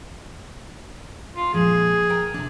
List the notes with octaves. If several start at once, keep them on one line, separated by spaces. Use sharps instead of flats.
F4
A#2 F3 G#3 G#4
A#4 G5 A#5
C3 D4